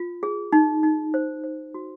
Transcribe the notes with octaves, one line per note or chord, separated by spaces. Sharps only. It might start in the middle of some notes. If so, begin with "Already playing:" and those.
Already playing: F4
G#4
D#4
D#4
C5
C5
F#4